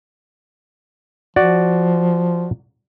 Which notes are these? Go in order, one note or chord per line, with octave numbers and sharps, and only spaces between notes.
F3 F#4 D5